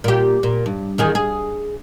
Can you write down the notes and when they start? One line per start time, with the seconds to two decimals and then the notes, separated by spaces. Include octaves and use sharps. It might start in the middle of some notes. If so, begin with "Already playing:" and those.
0.04 A#2 G4
0.43 A#2
0.66 G2
0.98 E2 D#3 G#4
1.15 G#4